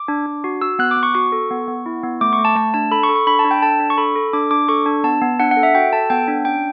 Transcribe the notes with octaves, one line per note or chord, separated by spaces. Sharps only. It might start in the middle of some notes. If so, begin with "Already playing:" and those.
Already playing: D6
D4
D4
F#4
F#4 E6
B3 F#6
D6
B3
C#6
F#4 C#6
A4
B3
B3
E4
B3
A3 D6
C#6
A3
A5
A3 A5
D4 A5
A4 B5
C#6
A4
C#6
D4 B5
A5
D4
G5
A4 A5
D4
C#6
A4 B5
A4
D4 D6
D4 D6
A4 C#6
D4
B3 A5
B3
D4 F#5
F#5
A4
E5
F#4 G5
A4 A5
B3 G5
D4
C#4 G5